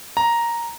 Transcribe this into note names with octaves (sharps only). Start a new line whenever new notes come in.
A#5